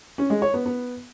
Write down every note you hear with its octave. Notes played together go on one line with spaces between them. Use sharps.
C#4
G#3
C#5
B3
B3